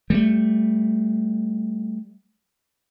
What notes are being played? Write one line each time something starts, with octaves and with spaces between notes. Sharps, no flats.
G3 A3